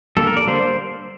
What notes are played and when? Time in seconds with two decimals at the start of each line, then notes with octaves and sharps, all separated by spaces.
0.17 D3 G3 A#3 A4
0.27 A#4
0.37 D5
0.47 D3 G3 A#3 C5